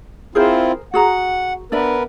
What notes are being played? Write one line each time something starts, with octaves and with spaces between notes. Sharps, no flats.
C4 E4 F4 G#4 A#4 C5
F#4 G#4 F#5 A#5
B3 D4 A#4 B4 D5 E5